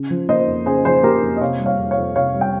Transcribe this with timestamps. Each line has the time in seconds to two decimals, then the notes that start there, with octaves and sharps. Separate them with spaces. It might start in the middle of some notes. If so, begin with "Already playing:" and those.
Already playing: C#3
0.10 F3
0.29 A#3 C5 D#5
0.47 F2
0.66 C#3 G#4 C5
0.85 F3 G#4 C5
1.03 A#3 G4 A#4
1.23 F2
1.37 D#5
1.41 C3 C#5 F5
1.60 G3
1.66 C#5 F5
1.78 F2
1.91 C#5 F5
1.97 F2
2.16 C3 C#5 F5
2.34 G3
2.41 G5